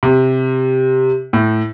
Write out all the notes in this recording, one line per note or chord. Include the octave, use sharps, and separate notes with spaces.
C3
A2